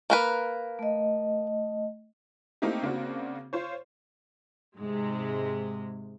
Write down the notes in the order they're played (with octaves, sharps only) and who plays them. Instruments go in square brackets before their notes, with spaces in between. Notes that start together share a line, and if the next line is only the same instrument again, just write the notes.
[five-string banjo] A#3 A#4 B4
[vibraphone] A3 D#5
[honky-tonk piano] A3 A#3 C4 D#4 E4 G4
C#3 A#3 C4 D4 F#4
F4 C5 C#5
[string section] G#2 C3 G#3